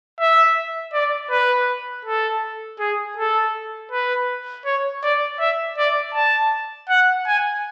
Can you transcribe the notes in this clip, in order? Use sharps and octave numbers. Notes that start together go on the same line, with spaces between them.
E5
D5
B4
A4
G#4
A4
B4
C#5
D5
E5
D5
A5
F#5
G#5